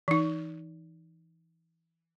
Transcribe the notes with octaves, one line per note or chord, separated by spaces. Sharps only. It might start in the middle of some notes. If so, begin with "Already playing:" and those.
E3 D#4